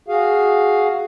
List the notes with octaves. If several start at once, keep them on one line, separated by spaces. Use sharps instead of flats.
F#4 G#4 F5